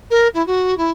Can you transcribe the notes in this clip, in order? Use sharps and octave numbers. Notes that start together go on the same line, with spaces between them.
A#4
E4
F#4
E4